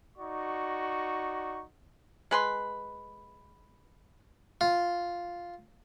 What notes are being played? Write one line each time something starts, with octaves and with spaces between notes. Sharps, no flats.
D#4 F#4 D5 C#6
G#3 B4 C6
F4